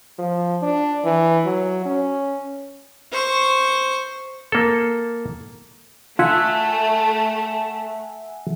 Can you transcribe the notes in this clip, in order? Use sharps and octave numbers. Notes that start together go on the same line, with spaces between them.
F3
D4
E3
F#3
C#4
C5 C#6
A#3 A4
A3 F4 E5 F#5 G#5 A5